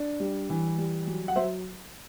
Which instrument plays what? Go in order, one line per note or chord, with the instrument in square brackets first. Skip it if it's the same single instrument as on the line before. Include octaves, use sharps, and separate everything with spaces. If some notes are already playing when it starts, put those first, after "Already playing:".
Already playing: [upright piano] D4
G3
E3
G3
F#3
F#5
F#3 C5 E5